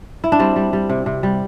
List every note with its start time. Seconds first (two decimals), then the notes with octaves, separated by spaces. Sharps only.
0.24 E4
0.32 D4
0.39 G3 C4
0.56 G3
0.73 G3
0.89 C3
1.06 C3
1.23 G3